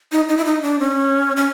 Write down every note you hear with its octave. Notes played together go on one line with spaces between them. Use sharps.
D#4
D#4
E4
D#4
D4
C#4
C#4